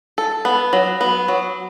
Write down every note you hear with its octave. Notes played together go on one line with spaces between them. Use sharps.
A4
B3
F#3
B3
F#3